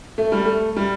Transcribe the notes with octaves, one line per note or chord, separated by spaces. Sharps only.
A3
G3
A3
G3